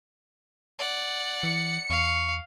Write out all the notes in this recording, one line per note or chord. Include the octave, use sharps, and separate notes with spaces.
D5 F#5
E3 C#7
E2 F5 C#6